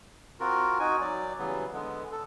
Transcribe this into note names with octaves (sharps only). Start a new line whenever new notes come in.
C4 F4 F#4 A#4
D#4 F#4 G#5
F#3 D5
C#3 E3 F#3 G3 B3
D3 G#3 B3
A4